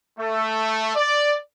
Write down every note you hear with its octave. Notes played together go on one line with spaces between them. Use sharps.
A3
D5